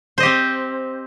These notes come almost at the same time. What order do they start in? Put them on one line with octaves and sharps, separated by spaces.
C5 D#5 G4 C4